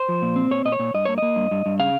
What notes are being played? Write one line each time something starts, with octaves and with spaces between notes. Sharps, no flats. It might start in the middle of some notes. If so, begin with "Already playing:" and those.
Already playing: C5
F3
A#2
C4
A#2 C#5
A#2 D#5
C#5
A#2
G2 D#5
A#3 C#5
A#3 D#5
G2
G2
G2
C#3 F5